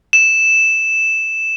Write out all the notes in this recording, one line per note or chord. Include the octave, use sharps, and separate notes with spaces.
E7